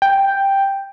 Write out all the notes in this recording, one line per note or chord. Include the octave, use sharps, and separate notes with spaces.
G5